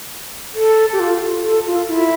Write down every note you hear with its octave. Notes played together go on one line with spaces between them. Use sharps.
A4
G4
F4
A4
F4
E4